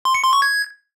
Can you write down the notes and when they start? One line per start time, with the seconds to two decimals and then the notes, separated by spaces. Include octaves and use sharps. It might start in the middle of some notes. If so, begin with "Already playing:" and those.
0.05 C6
0.14 C#7
0.24 C6
0.33 C#6
0.42 G#6